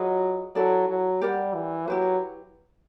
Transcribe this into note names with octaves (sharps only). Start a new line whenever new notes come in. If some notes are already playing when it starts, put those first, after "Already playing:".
Already playing: F#3 F4 G#4 B4 D#5
F#3 E4 A4 D5
F#3
G3 G4 A#4 D5 F#5
E3
F#3 E4 G4 B4